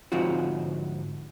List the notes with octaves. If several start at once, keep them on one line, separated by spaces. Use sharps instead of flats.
D2 G#2 F3 C4 F4 F#4